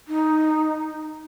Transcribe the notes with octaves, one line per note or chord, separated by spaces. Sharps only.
D#4